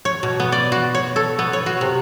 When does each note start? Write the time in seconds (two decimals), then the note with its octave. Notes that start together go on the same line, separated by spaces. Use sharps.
0.05 C#5
0.23 B2
0.40 B3
0.52 D5
0.72 F#4
0.95 C#5
1.16 A4
1.39 B3
1.53 C#5
1.66 F#4
1.81 C3